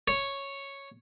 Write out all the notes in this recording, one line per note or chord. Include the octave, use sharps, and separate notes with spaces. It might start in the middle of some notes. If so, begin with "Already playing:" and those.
C#5